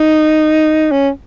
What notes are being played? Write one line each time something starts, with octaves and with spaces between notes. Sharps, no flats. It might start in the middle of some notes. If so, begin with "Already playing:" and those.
Already playing: D#4
C#4